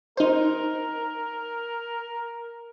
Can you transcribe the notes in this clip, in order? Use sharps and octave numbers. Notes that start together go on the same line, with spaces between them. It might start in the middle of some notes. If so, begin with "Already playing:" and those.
D#4 A#4 C5